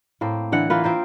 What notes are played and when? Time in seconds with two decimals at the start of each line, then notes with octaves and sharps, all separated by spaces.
0.21 A2 A#3 C4
0.52 D3 E3 F#5
0.70 E3 A#3 F4 B4
0.84 C4 F4 A#4 C5